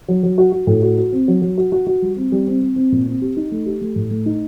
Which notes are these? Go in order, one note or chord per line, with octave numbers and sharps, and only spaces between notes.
F#3
F#3
F#4
F#4
A2
F#4
F#4
C4
F#3
F#3
F#4
F#4
F#4
G3
C4
G3
C4
C4
C4
A#2
C4
G4
D#4
A3
G4
A3
A2
A3
D#4